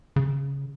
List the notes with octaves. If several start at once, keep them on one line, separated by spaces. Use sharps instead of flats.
C#3